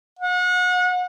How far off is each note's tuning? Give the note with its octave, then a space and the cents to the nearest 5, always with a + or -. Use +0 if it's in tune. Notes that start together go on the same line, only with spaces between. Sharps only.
F#5 -35